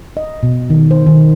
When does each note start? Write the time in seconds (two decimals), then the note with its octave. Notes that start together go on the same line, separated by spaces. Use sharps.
0.17 D#5
0.43 B2
0.70 D#3
0.91 C5
1.07 D#3